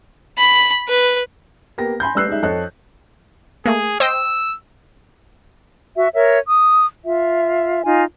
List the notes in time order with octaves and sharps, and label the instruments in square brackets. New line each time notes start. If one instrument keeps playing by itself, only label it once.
[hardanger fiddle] B5
B4
[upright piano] A#3 B3 G4 A#6
G#5 B5 C6 G6
G3 A3 B4 E6 F#6 C7
G3 G#3 D#4 E5
F2 C4 A4 C#5 D#5 F#6
[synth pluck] A3 A#3 [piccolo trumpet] G#4
[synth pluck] C5 D#5 G5 [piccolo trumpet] E6
[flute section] F#4 E5
A#4 C#5 E5
D#6
F4 E5
D#4 F4 G#5